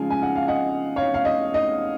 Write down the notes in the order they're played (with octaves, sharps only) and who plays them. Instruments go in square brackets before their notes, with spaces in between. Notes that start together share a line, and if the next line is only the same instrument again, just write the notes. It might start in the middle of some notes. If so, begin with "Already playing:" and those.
Already playing: [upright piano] C#3 F3 G#3 F5 G#5
G#5
F#5
F5
D#5 F#5
C#5 F5
F5
D#5
D#5